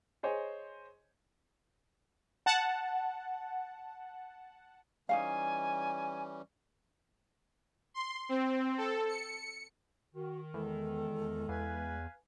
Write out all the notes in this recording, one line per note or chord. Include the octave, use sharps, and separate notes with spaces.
G#4 C5 C#5 D#5
F#5 A5
E3 G3 C#4 D#4 F#4 F5 G#5
C6
C4
A4
C#7
D#3 F#4
E2 G#3 A4
E2 B4 F5 G#5